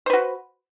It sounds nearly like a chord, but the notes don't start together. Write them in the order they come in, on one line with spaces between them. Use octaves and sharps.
C5 B4 F#4